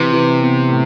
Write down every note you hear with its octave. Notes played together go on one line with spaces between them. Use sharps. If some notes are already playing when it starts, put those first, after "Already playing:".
Already playing: C3 E3
E3
B3
A2